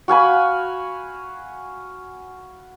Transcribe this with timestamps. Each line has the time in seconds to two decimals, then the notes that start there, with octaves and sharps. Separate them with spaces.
0.08 F#4 F5 G#5 B5